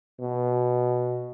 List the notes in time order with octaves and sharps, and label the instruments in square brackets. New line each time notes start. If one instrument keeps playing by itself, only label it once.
[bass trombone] B2